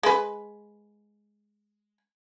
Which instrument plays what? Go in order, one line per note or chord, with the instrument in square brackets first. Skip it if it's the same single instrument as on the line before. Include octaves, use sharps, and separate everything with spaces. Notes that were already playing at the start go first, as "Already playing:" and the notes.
[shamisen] G#3 B4